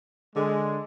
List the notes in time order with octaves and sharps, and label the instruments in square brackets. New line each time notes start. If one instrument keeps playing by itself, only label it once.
[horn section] D3 G#3